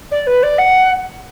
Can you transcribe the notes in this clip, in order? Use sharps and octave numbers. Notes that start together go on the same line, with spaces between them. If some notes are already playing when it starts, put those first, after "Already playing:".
D5
B4
D5
F#5